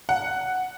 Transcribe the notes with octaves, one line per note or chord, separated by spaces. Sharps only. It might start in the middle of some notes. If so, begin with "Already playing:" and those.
F#5